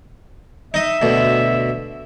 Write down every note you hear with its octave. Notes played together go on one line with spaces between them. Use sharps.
D#4 D#5 E5
D2 B2